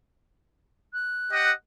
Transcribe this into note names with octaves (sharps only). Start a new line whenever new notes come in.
F#6
G4 D#5 F#5